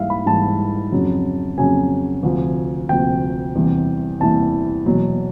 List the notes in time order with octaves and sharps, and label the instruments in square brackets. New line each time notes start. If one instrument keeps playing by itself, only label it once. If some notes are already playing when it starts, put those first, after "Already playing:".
Already playing: [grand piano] G#2 E3 G3 E5 F5
B5
G#2 E3 G3 A5
F2 C#3 F#3
F2 C#3 F#3 G#5
D2 C3 F3
D2 C3 F3 G5
E2 C3 E3 G3
E2 C3 E3 G3 A5
E2 B2 F#3